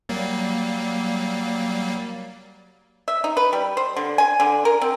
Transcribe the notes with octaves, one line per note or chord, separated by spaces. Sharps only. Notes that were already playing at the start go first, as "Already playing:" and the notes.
F#3 G3 A#3
E5
D#4
B4
G3
C5
D3
G#5
D3
A#4
C4